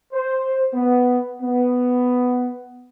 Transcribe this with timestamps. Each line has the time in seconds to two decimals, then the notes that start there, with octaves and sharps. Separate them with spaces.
0.13 C5
0.74 B3
1.42 B3